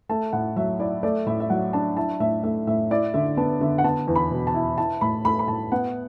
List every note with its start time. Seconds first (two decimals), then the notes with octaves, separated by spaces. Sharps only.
0.09 A3 A5
0.33 A2 F#5
0.56 F#3 E5
0.80 E4 D5
1.03 A3 D5
1.26 A2 E5
1.40 E5
1.50 F#3 F#5
1.73 D4 A5
1.97 E4 A5
2.20 A2 E5
2.43 A3 E5
2.67 A2 E5
2.91 E4 D5
3.14 D3 E5
3.37 B3 A5
3.61 D3 E5
3.78 F#5
3.84 B3 A5
4.07 E2
4.16 B5
4.31 B2
4.47 A5
4.54 E4
4.78 E4 A5
5.01 A2 B5
5.25 A3 B5
5.39 B5
5.48 A2 A5
5.72 B3 F#5